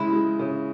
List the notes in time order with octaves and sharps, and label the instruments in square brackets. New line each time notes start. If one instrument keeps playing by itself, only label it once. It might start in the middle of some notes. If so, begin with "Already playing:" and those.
Already playing: [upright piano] C#3 G#3 [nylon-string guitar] E4
[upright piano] G#3
C#3